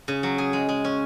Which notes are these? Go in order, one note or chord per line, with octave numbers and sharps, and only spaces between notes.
C#3
F#3
G#4
G#3
G#3
C#4